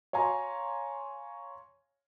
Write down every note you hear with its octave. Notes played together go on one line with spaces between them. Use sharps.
C#5 F5 G#5 A#5 C6